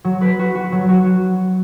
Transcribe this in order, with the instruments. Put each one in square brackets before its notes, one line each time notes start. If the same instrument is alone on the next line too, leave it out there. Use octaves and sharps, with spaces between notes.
[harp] F#3
B4
F#4
F#4
F#3
F#4